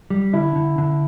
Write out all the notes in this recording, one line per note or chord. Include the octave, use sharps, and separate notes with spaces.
G3
D3 E4
D3
D3